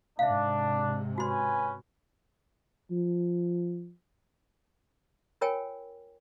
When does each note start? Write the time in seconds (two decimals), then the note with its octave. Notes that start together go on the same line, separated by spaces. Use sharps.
0.19 G#2 C3 D4 E5 F5
1.18 C#4 F#4 B4 G#5 C6
2.91 F3
5.41 F4 A#4 C#5 G5 G#5